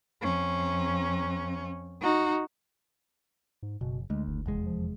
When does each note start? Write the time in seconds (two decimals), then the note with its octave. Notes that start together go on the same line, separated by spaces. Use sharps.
0.22 F2 C#4
2.01 D#4 F#4
3.63 G#2
3.81 F#1 B2
4.10 D2 G#3
4.27 F#1
4.46 F1 E2 G#3
4.66 F3